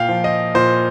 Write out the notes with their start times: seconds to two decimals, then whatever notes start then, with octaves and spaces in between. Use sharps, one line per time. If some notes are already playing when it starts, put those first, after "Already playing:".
Already playing: A#2 F5 G5
0.09 F3
0.24 D#5
0.55 A#2 C5